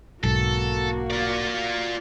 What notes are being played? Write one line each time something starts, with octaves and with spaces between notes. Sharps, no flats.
B1 G#2 A#3 F#4 A4
F4 D5